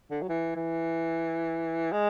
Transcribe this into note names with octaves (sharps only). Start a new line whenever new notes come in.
D3
F#3
E3
E3
G#3